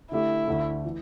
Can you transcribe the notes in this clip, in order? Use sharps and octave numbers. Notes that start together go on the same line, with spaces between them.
D3 A3 E4 G4
D2 D3 A3
E3